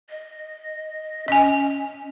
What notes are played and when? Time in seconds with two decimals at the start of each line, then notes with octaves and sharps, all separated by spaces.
0.10 D#5
1.28 C#4 D#5 G#5